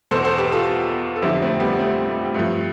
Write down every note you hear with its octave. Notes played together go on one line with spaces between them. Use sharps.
E2 B2 A4 C5
A4 C5
G4 B4
F4 A4
A4
F2 D3 F3 E4 G4
A3 C4
G3 B3
A3 C4
A3
G3
G2 F3 A3